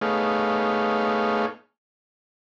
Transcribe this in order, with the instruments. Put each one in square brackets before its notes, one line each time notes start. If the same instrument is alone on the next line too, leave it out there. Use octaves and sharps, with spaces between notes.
[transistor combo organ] A3 B3 D#4 G#4 C#5 F5